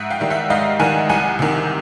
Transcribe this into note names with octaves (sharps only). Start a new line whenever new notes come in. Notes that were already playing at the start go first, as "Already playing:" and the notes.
Already playing: G#2 E5 F#5
F5 G5
D#3 G3
E5 F#5
G#2 D#5 F5
D#3 G3 F#5 G#5
C2 F#5 G#5
C3 D#3